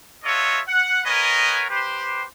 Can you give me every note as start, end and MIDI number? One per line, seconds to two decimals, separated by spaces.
0.24 0.60 65
0.24 0.60 66
0.24 0.60 69
0.24 0.60 73
0.24 0.60 75
0.24 0.60 76
0.67 1.01 78
1.05 1.65 59
1.05 1.65 70
1.05 1.65 71
1.05 1.65 73
1.05 1.65 75
1.05 1.65 80
1.70 2.24 67
1.70 2.24 71
1.70 2.24 72